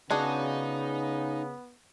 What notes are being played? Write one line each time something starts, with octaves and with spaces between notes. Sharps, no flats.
C#3 B3 D4 D#4 F#4 G#4